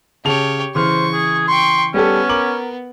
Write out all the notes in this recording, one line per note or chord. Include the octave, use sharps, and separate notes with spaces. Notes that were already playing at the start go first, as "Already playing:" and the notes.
C#3 G4 C#5 A5 F7
C#3 E3 C5 C#6 F6
G#4
G5 C6 C#6
G3 B3 C#4 G4 A4
A#4 D6 F#7